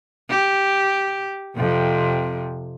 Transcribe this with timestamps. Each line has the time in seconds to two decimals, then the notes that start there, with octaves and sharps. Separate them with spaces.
0.30 G4
1.56 F2 C3